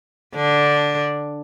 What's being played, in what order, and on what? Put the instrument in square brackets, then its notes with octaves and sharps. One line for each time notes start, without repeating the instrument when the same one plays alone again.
[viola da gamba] D3 D4